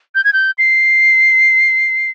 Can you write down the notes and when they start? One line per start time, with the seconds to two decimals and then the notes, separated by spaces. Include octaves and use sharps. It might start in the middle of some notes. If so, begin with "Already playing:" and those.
0.15 G6
0.24 G#6
0.33 G6
0.58 C7